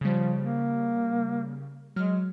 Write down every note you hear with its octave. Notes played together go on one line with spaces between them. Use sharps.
C#3 F3 G3
A#3
F#3 G#3 F6